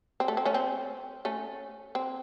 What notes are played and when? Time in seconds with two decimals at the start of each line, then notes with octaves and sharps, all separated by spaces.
0.20 C4
0.28 A3
0.37 C4
0.45 A3 C#4
0.54 C4
1.25 A3 C#4
1.95 C4